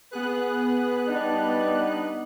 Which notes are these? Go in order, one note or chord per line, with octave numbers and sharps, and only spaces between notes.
B3 G#4 B4 F#6
G3 D4 D#4